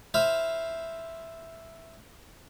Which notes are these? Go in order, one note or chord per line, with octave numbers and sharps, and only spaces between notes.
E4 C5 E5 F5